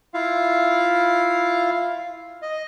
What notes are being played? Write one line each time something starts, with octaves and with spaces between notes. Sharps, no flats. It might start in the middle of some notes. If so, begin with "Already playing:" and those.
E4 F4 F5
D#5